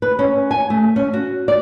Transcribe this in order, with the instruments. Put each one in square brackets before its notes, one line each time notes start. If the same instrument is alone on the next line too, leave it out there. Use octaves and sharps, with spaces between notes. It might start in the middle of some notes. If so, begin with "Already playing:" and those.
[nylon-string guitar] B4
C#4
G#5
A3
C#4
F#4
D5